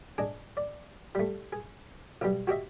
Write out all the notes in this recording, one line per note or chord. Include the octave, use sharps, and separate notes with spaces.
D4 G#4 D#5
D5
G3 A3
G#4
B1 B2 G3
F#4 G4 D#5 E5